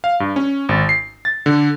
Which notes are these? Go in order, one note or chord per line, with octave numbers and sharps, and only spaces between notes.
F5
G2
C#4
G#1
C7
A6
D3